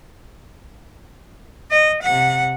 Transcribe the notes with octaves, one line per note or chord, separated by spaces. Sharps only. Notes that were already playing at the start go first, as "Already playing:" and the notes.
D#5
C3 F#5